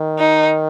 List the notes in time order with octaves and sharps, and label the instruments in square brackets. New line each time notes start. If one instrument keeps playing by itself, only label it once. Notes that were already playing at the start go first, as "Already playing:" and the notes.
Already playing: [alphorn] D#3
[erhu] D#4